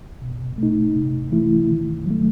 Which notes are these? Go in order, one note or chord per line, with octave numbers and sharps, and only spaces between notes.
B2
A3 D#4
C3
E3 A3 E4
D#3
F#3 A3